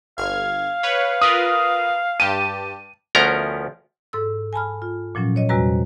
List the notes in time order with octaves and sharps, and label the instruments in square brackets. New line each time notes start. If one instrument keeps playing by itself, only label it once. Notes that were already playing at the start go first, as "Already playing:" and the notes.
[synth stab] G1 F6 G#6 [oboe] F5
[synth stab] B4 C#5
[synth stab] F4 A#4 B4 [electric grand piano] D#6
[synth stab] G2 G4 A5 [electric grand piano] D#7
[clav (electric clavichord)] D2 F3 B3 C#4 A#4 A#5
[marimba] G#2 A4 E6
G#5 A5 B5 F6
F4
A#2 F3 F#3 C#4
C#5 D#5
E2 C3 G3 F#4 B4 A#5